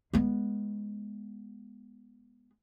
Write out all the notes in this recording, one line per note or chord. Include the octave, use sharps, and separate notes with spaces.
G#3 B3